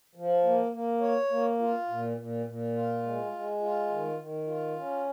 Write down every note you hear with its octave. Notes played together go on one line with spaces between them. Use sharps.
F3
A#3
A#3
C#5
A#3
F4
A#2
A#2
A#2
F4
G#3
G#3
F4
D#3
D#3
F4
C#4